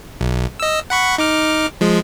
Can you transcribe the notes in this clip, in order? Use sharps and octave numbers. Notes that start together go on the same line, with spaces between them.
B1
D#5 E6
F#5 B5 C#6
D#4 D6 F6
F3 G#3